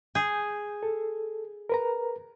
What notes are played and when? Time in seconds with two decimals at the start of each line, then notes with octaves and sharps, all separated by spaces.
0.15 G#4 G6
0.83 A4
1.69 A#4 B4 A#5